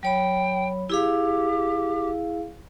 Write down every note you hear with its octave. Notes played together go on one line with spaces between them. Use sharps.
F#3 C#5 G5 B5
E4 G4 G#4 F5